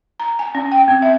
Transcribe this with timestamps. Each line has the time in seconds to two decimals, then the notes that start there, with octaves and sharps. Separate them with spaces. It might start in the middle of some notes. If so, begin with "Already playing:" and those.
0.20 A#5
0.39 G#5
0.55 C#4
0.72 G5
0.88 C4
1.02 E5